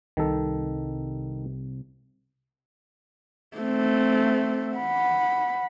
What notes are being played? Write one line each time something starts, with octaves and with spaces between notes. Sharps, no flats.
C2 D#3 A4
A3 C4
F#5 B5